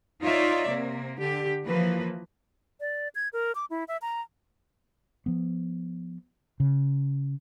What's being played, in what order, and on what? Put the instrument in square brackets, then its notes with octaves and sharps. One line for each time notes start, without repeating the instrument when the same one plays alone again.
[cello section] D#4 F4 C#5 D5 E5
C3 A#3
D3 G4
E3 F3 A#3 B4
[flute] D5
G#6
A#4
D6
E4
E5
A#5
[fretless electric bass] F3 B3
C#3